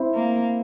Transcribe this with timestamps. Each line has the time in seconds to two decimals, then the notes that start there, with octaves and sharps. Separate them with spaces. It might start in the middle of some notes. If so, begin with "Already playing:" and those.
Already playing: C4 E4
0.14 A#3